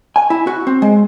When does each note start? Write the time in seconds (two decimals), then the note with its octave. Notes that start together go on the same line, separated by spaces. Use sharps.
0.16 G#5
0.30 E4
0.47 F#4
0.67 C4
0.82 G#3